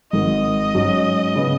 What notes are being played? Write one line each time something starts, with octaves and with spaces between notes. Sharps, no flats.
G#1 G#2 D#3 D#5
G#2 F#3 C#4 F#4
C#3 B3